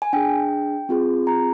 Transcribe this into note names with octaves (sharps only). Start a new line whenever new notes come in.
G#5
D4 G#4 G5
C4 F4 G#4
A#5